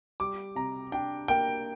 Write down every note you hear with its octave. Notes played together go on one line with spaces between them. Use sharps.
G3 D6
C3 A#5
D4 G5
A#3 G5